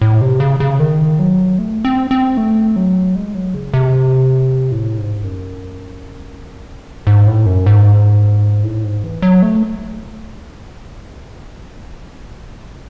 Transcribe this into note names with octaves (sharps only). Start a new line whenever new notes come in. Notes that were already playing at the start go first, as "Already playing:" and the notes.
A2
C3
C#3
C#3
D#3
F#3
A3
C4
C4
A3
F#3
G#3
F#3
C#3
C3
A2
G#2
F#2
G#2
A2
F#2
G#2
A2
G#2
E3
F#3
A3